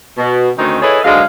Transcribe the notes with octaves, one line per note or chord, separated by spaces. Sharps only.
B2
D2 D#3 C4 C#4 D#4
E4 G#4 A4 B4 C#5 D#5
G#2 D3 F#3 G#3 G#4 F5